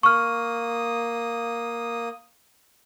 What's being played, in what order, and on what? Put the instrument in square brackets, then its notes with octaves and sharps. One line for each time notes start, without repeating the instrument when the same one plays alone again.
[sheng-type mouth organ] A#3 D#6 [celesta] C#6 F6